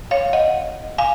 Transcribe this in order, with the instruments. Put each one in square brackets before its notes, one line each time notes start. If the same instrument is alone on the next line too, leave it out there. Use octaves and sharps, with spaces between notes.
[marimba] C#5 F5
D#5 F#5
F5 G#5